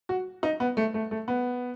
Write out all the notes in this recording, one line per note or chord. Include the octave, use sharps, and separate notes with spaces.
F#4
D#4
B3
A3
A3
A3
B3